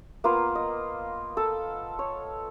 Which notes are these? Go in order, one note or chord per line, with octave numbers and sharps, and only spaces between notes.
A#3 B3 F4
D#5
A4
C#5